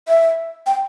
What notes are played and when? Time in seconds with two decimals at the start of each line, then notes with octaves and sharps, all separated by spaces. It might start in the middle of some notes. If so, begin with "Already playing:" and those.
0.08 E5
0.66 G5